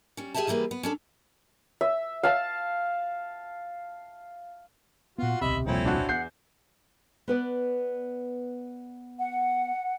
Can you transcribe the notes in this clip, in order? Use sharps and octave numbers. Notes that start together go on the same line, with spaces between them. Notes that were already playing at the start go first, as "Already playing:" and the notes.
G3 C#4
G4 G#4 C#5 E5 G#5 A5
E3 G3 A#3 G#4 B4
B3
C#4 D4 A4
E5
F5 A5
A#2 B3 F4 F#4
D1 B1 C3 D#5 E5 B5
C2 F2 A#2 C4 C#4 E4
D4 F#4
E2 F#5 G6 C7
B3 B4 D5
F#5